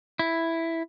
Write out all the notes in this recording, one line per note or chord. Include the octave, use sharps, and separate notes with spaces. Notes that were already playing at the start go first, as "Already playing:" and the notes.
E4